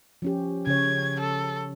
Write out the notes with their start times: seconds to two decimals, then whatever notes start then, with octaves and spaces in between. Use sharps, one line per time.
0.22 F3 C#4 G4
0.67 C#3 C#5 G#6
1.20 A4